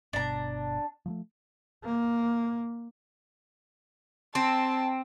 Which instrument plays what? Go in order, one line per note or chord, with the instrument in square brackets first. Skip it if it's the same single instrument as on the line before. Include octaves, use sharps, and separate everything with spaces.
[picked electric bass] G1 B2 [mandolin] D4 A#5
[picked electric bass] F3 F#3 A3
[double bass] A#3
[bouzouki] C4 [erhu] A5